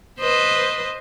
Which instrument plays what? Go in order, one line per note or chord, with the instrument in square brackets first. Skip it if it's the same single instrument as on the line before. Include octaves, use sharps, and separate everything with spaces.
[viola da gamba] B4 C5 D#5